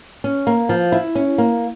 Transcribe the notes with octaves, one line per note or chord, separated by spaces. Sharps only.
C#4
A#3
F3
E4
C#4
A#3